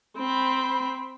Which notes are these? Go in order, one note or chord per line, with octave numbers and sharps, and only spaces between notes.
C4 B5